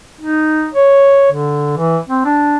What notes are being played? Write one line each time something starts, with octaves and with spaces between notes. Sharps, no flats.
D#4
C#5
D3
E3
C4
D4